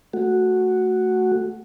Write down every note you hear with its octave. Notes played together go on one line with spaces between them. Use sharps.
A3 F#4